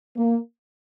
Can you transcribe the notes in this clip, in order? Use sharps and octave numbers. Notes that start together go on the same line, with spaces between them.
A#3